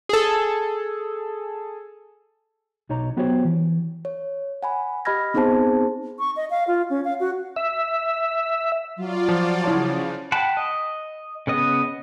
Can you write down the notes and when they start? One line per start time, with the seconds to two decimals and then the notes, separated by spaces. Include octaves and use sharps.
0.09 G#4 A4
2.89 B1 D#4 C#5 A#5
3.17 F#3 B3 F#4 G4 C5 C#5
3.45 E3
4.05 C#5
4.63 F#5 G#5 B5
5.05 G4 D#5 B5 F6 G#6 A#6
5.34 B3 C4 D#4 G#4 C5 A5
6.19 C#6
6.36 D#5
6.50 F5
6.68 F4
6.90 C#4
7.04 F5
7.20 F#4
7.56 E5
8.97 F#3 F4 D5
9.29 F3
9.64 C#3 E4 C#5 A5
10.32 F#5 G5 A5 B5
10.57 D#5
11.47 C#3 B3 D#5